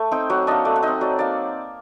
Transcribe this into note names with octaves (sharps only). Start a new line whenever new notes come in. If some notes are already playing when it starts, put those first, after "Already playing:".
Already playing: A3
C4 D#4 G5
F#3 F#5
A#3 D4 D#5
A3 D5
F#5
C4 D#4 D#5
F#3 D5
A#3 D#4 D5